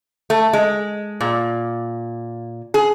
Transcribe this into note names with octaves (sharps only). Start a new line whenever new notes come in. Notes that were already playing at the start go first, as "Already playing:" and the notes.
A3
G#3
A#2
G#4